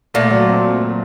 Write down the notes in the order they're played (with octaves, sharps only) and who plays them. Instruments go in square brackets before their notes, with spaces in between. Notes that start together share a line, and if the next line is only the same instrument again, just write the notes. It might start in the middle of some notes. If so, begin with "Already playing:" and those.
[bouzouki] A#2 [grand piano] A3
[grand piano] F#3
C4
A3
F#3